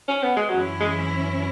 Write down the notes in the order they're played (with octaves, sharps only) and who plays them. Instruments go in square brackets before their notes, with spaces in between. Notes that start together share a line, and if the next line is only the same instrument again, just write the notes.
[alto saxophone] C#4
B3
G#3
[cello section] F#2 E3 C#4 E4 [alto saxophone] F#3
[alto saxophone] G#3